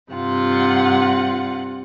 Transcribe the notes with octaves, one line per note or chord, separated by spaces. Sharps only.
G2 C3 F4 F#5